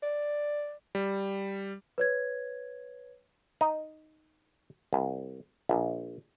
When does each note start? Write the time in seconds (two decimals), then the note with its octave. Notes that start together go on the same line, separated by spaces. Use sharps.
0.03 D5
0.95 G3
1.98 B4 C#5 G#6
3.61 D#4
4.93 C2
5.69 A#1